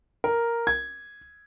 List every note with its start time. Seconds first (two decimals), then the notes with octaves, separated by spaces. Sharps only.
0.24 A#4
0.67 G#6